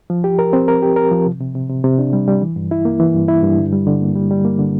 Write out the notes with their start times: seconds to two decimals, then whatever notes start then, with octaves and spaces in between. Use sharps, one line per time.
0.10 F3
0.24 G4
0.39 A#4
0.53 C4
0.68 A#4
0.82 G4
0.96 A#4
1.11 F3
1.26 C3
1.40 C3
1.55 C3
1.69 C3
1.84 C3
1.98 D4
2.13 G3
2.28 G3
2.42 E3
2.56 G2
2.71 E4
2.85 A#3
3.00 E3
3.14 G2
3.28 E4
3.43 G2
3.58 D3
3.73 G3
3.87 D3
4.01 A#3
4.16 G3
4.31 G3
4.45 A#3
4.59 D3